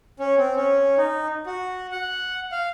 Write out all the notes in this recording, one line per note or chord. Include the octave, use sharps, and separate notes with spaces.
C#4
C4
C#4
D#4
F#4
F#5
F5